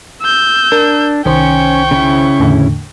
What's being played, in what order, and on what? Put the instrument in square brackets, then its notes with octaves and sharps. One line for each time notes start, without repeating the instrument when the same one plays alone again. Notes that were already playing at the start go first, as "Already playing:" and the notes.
[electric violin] E6 G6
[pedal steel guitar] D4 [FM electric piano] A#4
[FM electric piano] C2 D#3 C5 [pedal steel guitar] C#4 [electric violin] G5 C#6
[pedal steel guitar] C#3 C#4 E4
[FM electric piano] E2 A2 D3